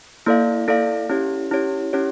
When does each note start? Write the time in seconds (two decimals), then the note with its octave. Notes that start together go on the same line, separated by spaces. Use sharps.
0.26 A#3 E4 A4 D5 F5
0.68 A#3 E4 A4 D5 F5
1.09 C#4 E4 G4 C#5
1.51 C#4 E4 G4 C#5
1.93 C#4 E4 G4 C#5